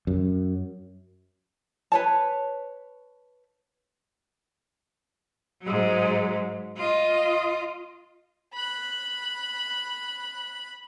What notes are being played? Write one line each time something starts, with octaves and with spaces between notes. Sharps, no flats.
F#2
B4 C#5 A5
G#2 F#3
F4 D#5
B5 F#6